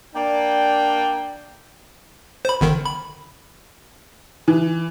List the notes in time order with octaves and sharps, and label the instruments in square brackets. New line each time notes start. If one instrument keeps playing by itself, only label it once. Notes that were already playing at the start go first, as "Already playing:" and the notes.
[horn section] A#3 D4 D5 G5
[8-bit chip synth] C5 B5
G1 D3 D#3
B5
[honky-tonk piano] E3